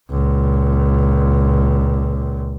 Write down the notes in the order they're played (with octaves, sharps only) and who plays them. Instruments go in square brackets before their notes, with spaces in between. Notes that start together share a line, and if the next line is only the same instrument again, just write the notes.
[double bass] C#2 A#2